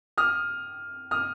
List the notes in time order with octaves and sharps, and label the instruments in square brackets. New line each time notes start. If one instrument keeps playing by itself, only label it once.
[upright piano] D#6 F6
D#6 F6